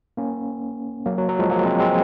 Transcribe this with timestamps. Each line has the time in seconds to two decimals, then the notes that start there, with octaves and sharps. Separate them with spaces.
0.17 A#3 C#4
1.06 F#3 A#3
1.18 F#3
1.29 F#3
1.39 F3 G#3
1.50 F#3 A#3
1.65 G#3 C4
1.80 G#3 C4